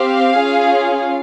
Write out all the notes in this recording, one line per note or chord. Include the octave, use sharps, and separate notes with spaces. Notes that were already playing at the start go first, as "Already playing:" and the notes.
Already playing: C4 G4 F5
C#4 F4 G#4